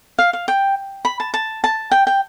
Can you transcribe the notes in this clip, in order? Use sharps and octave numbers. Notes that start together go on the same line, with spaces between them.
F5
F5
G5
B5
A5
A5
A5
G5
G5